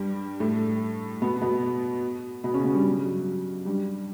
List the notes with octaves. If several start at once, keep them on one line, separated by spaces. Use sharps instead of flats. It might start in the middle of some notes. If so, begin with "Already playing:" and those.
Already playing: G2 G3
A2 A3
B2 B3
B2 B3
B2 B3
C#3 C#4
B2 B3
G2 G3
F#3
F#3
G2 G3